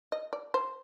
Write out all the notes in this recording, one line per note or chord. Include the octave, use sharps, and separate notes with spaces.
D#5
D5
C5